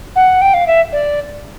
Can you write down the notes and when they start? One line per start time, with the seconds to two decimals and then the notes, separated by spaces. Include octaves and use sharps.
0.16 F#5
0.41 G5
0.54 F5
0.67 E5
0.92 D5